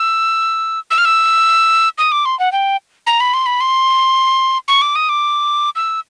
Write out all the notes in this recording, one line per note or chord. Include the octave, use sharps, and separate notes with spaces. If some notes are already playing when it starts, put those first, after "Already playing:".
Already playing: E6
E6
F6
E6
D#6
D6
C6
F#5
G5
A#5
B5
C6
B5
C6
C#6
D6
D#6
D6
E6